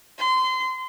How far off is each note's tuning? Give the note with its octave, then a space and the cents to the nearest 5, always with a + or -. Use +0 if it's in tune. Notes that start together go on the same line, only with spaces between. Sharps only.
C6 -25